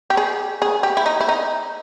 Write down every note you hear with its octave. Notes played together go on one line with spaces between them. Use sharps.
G4
G#4
G#4
G4
E4
D#4
E4
D#4